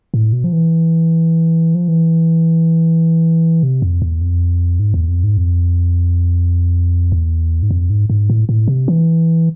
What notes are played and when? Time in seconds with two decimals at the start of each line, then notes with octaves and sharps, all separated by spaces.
0.14 A2
0.33 B2
0.44 F3
0.53 E3
1.75 F3
1.88 E3
3.63 C3
3.82 F2
4.02 E2
4.21 F2
4.80 G#2
4.94 E2
5.08 F2
5.24 G#2
5.37 F2
7.12 E2
7.63 G#2
7.71 F2
7.90 G#2
8.10 G#2
8.30 A2
8.49 A2
8.68 C3
8.88 E3